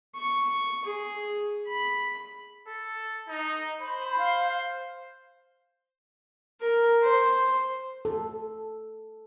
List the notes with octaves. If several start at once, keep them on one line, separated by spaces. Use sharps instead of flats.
C#6
G#4
B5
A4
D#4
C5 B5
F5
A#4
C5
A4